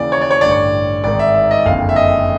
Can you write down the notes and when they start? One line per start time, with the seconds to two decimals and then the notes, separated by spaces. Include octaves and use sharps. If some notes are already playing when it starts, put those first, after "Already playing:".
Already playing: D#2 C#3 E3 D5
0.12 C#5
0.21 D5
0.31 C#5
0.41 A1 G2 D3 D5
0.51 C#5
1.04 G#1 G#2 D#3 D5
1.19 E5
1.34 E5
1.51 D#5
1.65 F#1 F2 D3 F5
1.89 E5
1.96 D#5